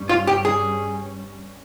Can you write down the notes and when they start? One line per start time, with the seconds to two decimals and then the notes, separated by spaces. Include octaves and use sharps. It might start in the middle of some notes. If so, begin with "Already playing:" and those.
Already playing: G2 G3 C#4
0.09 F4
0.27 G4
0.45 G#4